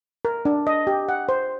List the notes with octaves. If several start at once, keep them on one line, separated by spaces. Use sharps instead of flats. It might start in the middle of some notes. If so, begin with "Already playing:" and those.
A#4
D4
D#5
G4
F#5
C5